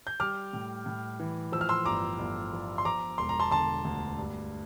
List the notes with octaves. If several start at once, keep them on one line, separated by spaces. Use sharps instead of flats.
G6
G3 D6 F6
A2
A2
E3
F3 E6
F6
C6 E6
G1 A#5 D6
G1
F3
C6
F3 A#5 D6
E1 C6
A#5
A5 C6
D3 A5 C6
D2
G2